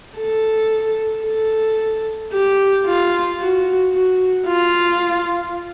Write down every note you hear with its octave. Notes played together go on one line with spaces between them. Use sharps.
A4
A4
G4
F4
F#4
F#4
F4